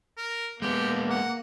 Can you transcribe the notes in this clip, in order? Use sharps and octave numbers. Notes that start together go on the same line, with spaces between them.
A#4
G#3 A#3 B3 G4
F#5